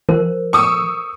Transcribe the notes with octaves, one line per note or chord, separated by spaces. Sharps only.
F3 A#4 C5
C#6 D#6 E6